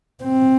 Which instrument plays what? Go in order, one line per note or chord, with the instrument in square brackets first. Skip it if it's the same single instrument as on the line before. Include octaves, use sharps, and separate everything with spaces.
[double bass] C4